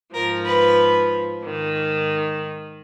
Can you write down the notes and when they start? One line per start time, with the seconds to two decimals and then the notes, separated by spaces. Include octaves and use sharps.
0.13 G#2 F3 A#4
0.45 B4
1.41 G#2 D#3